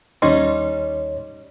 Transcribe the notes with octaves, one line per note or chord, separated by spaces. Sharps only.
D#2 G3 C#4 D#4 C#5 C6